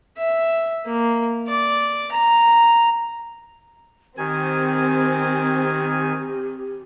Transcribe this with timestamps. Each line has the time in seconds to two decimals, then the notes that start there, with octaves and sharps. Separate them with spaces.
0.17 E5
0.85 A#3
1.47 D5
2.11 A#5
4.18 D#3 C4 G4 G#5